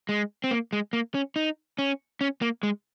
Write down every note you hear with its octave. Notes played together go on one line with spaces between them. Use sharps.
G#3
C4
A#3
G#3
A#3
C#4
D#4
C#4
C#4
A#3
G#3